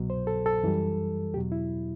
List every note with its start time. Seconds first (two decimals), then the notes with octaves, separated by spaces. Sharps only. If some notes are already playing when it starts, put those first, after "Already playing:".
Already playing: C2 B2 F#3
0.10 C5
0.27 A4
0.46 A4
0.63 F#2 E3 G3
1.34 E2 B2 F#3 G4
1.52 E4